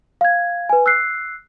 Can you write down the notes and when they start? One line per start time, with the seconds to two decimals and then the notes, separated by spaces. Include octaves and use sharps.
0.21 F5 G#6
0.69 B4 G#5
0.86 E6 F#6 C7